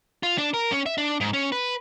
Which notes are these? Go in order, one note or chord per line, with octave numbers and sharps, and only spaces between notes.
F4
D4
A#4
C#4
E5
D4
G#2
C#4
B4